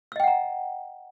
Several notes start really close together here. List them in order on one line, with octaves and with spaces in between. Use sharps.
E6 D#5 G5 F#5 A#5